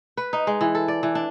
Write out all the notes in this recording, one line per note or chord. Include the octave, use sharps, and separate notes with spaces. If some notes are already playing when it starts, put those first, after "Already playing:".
B4
D#4
G#3
E3
A4
D5
E3
D4